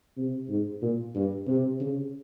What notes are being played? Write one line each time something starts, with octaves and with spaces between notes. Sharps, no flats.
C3
G#2
A#2
G2
C3
C#3